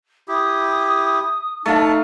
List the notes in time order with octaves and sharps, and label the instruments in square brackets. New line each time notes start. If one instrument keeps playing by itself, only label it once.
[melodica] E4 G4 [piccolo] D#6
[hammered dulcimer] A3 F5 [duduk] D#4 [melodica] A5 [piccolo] A6